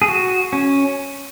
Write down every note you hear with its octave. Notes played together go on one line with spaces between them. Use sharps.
G#4
F#4
C#4